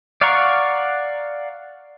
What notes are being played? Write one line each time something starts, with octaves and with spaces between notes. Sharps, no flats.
D5 F5 F#5 A#5 C#6